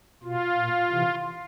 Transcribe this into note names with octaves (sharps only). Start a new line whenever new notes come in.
B2 F4
A#2
C3 E3